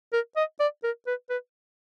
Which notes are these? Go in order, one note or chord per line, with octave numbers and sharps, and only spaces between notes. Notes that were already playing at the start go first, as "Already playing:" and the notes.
A#4
D#5
D5
A#4
B4
B4